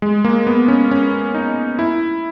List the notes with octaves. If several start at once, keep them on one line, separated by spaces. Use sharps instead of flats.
G#3
A#3
B3
C#4
C#4
D#4
E4